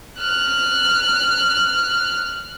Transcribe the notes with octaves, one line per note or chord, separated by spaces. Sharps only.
F6 F#6